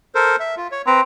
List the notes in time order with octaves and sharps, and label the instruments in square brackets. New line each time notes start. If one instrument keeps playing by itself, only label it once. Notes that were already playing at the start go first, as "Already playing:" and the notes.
[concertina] A4 A#4 C5
E5
F4
C#5
[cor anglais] C4 [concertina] B4 A#5